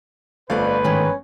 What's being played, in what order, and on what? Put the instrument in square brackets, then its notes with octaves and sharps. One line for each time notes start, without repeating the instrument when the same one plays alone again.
[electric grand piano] G1 A3 [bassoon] F2 [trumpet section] B4 [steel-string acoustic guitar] D5 F5
[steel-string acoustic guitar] G#2 D#3 G#3 [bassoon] C#4